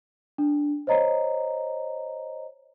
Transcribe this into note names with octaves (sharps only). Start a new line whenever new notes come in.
D4
C5 C#5 D#5 A#5